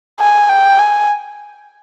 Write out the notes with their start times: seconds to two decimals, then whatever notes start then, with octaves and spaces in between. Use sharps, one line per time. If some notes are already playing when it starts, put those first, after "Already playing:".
0.20 G#5
0.49 G5
0.79 G#5